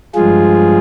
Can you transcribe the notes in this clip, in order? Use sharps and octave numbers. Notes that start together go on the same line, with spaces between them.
G2 F3 G#3 F4 G#4